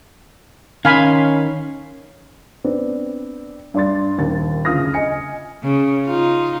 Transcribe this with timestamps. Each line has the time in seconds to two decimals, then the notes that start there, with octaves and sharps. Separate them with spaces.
0.85 D#3 C#4 F5 G#5 B5 C6
2.64 B3 C4 D4
3.74 G2 D5 C6 A6
4.18 D#1 D#2 A6
4.65 F#1 D2 F4 D#6 F6 A#6
4.94 D#5 G#5 C#7
5.63 C#3
6.06 D#4 F4